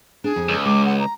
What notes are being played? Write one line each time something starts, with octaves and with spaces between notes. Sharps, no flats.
D4 G#4
F2
C#2
G#3 D6
F#5
A#5